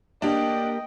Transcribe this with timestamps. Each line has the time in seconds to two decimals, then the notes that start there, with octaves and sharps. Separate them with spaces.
0.22 A#3 D4 G4 A#4 D#5 G5